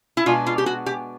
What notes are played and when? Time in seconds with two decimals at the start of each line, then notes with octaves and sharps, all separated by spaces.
0.17 E4
0.26 B2 G#3 B3 D4 F4
0.46 F4
0.58 G4
0.66 F#4
0.86 G4